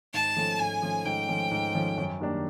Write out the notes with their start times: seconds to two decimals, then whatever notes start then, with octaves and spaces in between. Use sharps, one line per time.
0.13 G#2 A5
0.36 F3 A3 C#4
0.59 G#2 G#5
0.82 F3 A3 C#4
1.05 G#2 G5
1.28 F3 A3 C#4
1.51 G#2
1.75 F3 A3 C#4
1.98 F#2
2.20 D#3 G3 A#3 D4